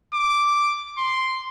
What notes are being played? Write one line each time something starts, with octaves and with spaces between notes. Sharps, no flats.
D6
C6